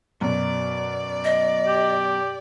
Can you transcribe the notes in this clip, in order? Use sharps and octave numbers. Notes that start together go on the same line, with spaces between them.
F#2 B2 D5
D#5
G4